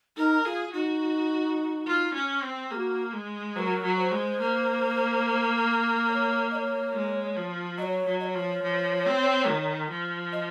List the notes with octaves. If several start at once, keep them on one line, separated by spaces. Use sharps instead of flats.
D#4 A#4
F4 G#4
D#4 F#4
F4
C#4
C4
A#3 F#4 G#4
G#3
F#3 A#4 C5
F#3
C5
G#3
A#3
C#5
D#5
C#5
G#3
F3
F#3 C#5 D#5
F#3
D#5
C#5
F3
F3
C4
D#3
F3
D#5